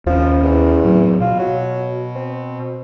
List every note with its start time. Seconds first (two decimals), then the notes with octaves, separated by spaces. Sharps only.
0.06 D#2 F3 C#4
0.43 E2
0.84 A2 F#3
1.20 B2 F4
1.39 F#3
2.15 C4